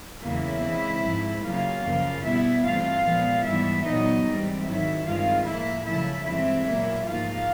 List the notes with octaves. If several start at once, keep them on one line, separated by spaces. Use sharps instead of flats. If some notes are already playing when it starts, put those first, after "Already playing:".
E2 C#3 F#3 A#3 E4 E5
C#3 E3 G#3 C4
G#2 F3 G#3
C#3 F#3 A#3 F4 F5
F#2 C#3 F3 A#3
B2 G3 B3 E4 E5
G2 E3 A3 C4 F4 F5
A#2 F3 G#3 B3
G#2 E3 G3 B3 E4 E5
A#2 F#3 B3 D#4 D#5
G#2 E3 G3 C4
G#2 D#3 F#3 E4 E5
G2 D#3 G#3 C4 F4 F5
A2 F3 A#3 E4 E5
F#2 C#3 F3 A3 E4 E5
G2 E3 G#3 C4 E4 E5
A#2 F#3 A#3
G#2 F3 A#3 F4 F5